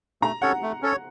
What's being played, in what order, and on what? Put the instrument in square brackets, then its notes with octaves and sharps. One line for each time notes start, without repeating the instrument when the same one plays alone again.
[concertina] A3 [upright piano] A#5
[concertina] C#4 A4 C#5 [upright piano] F#5
[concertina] A3
C#4 A4 C#5